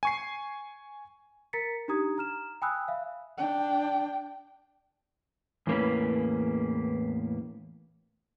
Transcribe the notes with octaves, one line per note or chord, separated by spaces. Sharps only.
G#5 C#6 C7
A#4 A#5 A6 B6 C#7
D4 D#4 G4 A#5 D#6 G#6
A#5 F6 E7
G5 G#5 B5 D#6 E6 F#6
E5 F5
D4 G5
E2 A2 A#3 C#4 B4